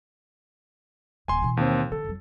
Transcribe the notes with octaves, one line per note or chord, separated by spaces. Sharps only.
D#1 C#3 G#5 C6
B2 E3
D#2 C4
D3 B3 A4
F2 F#3